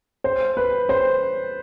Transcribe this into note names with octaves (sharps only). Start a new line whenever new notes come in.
C5
B4
C5